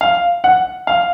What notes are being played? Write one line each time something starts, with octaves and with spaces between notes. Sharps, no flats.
F5
F#5
F5